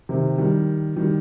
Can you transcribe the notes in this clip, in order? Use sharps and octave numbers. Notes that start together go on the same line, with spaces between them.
C3 D#3
D#3 G3
D#3 G3